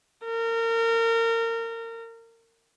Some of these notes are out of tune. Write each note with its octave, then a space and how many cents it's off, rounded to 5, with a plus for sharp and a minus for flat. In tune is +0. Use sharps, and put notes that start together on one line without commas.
A#4 -30